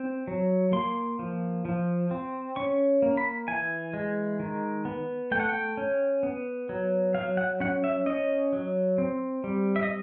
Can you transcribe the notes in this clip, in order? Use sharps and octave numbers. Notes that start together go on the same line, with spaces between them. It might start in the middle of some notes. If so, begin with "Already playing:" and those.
Already playing: C4
F#3
A#3 C6
F3
F3
C4
C#4 C#6
A#3
B5
E3 G#5
G#3
D#3
B3
A3 G5
F#5
G5
C#4
B3
F#3
F#3 F5
F#5
C#4 F#5
E5
C#4 D#5
F#3
C4
G3
E5
D#5